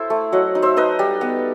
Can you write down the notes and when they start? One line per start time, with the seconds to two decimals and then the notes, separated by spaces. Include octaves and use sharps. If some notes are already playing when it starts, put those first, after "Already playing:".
Already playing: E4 A4 C5 E5
0.10 A3
0.32 F#3 D#5 F#5
0.55 D#4
0.62 C5 E5
0.77 D#4 B4 D#5
0.99 G3
1.21 B3